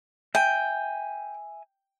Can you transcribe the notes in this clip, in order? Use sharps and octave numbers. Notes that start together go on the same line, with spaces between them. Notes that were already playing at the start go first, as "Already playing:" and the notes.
E5 G5 G#5